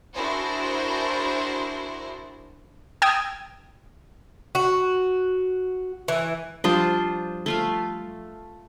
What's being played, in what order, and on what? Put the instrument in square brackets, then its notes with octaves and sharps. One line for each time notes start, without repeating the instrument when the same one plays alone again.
[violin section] D4 E4 F#4 G#4 A#4 C5
[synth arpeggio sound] G5 D#6 E6 G#6
[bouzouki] F#4
E3
[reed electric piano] F3 G3 D#6 [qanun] D4 F4 C5
[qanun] A3 F4 F5